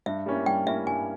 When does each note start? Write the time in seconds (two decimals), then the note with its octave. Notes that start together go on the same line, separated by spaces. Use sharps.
0.06 G2 E5
0.26 G3 A#3 C#4 E4
0.46 G2 G5
0.66 G3 A#3 C#4 E4 E5
0.87 G2 G#5